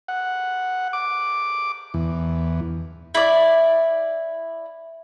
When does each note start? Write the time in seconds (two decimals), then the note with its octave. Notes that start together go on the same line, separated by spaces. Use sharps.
0.08 F#5
0.93 D6
1.94 E2
3.15 E4 D5